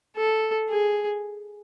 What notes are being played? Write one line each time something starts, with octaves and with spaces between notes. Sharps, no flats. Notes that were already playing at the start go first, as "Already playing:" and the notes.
A4
G#4